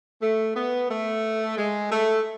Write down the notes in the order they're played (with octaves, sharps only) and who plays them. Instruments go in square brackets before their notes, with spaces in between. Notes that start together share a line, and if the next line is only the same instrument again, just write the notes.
[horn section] A3
B3
A3
G#3
A3